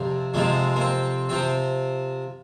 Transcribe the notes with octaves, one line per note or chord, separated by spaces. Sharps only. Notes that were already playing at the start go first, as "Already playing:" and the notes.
Already playing: F2 C3 F3 D4
F2 C3 F3 G#3
A#3
C4
C3 F3 C4